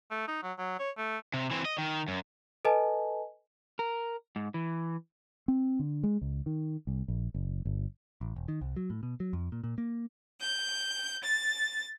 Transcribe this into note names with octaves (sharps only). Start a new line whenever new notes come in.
A3
D#4
F#3
F#3
C#5
A3
C3
E3 C4
D#5
D#3
F#2
A4 B4 D#5 G#5 A5
A#4
G#2
E3
C4
D3
G#3
C#2
D#3
C2
A#1
F#1
G1
A1
E1
D#3
C2
F#3
A2
B2
F#3
F2
A#2
A#2
A#3
G6
A6